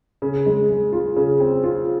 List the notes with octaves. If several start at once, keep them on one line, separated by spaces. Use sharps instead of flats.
C#3
G#3
G#3
F4
C#3
C4
F4